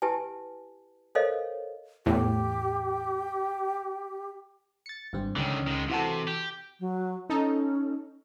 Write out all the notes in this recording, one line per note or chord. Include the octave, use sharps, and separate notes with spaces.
E4 G4 B4 G#5 A5
A4 A#4 C5 C#5 D#5 F5
E2 A2 G4
A6 C#7
G#1 G2 C4
C#2 D3 D#3 C#4
D#3 G#3
C3 E3 F#4 A4
G4
F#3
C#4 D#4 A4